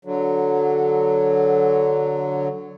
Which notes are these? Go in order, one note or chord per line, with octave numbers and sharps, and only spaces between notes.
D3 F#3